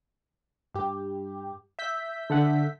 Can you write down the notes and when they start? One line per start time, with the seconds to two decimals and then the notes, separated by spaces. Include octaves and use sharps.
0.74 G2 G4
1.79 E5 G6 B6
2.30 D3 A4 F#5